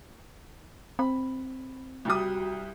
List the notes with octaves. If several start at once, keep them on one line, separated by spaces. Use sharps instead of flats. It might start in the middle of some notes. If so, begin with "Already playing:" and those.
C4 B5
C2 G3 F#4 D#6